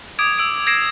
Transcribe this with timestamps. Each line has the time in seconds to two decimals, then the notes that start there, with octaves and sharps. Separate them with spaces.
0.19 D6 D#6 G#6 D7
0.39 E6 D7
0.67 G#6 A#6 C7 D7 E7